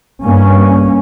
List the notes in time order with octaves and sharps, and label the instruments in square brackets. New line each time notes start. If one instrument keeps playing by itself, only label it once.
[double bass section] G2 A#3 C#4